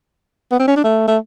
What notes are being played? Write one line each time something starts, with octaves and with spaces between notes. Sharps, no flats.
B3
C4
C#4
D4
A3
A3